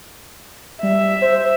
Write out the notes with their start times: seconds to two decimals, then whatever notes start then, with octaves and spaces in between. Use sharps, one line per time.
0.83 G3 E5
1.22 C5